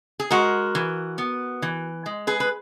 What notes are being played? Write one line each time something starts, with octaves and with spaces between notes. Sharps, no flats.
G#4
G#3 F#4 A#4
E3
B3
E3
G#3
G#4 B4
B4